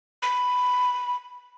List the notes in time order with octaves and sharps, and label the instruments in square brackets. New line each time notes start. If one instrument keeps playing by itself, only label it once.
[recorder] B5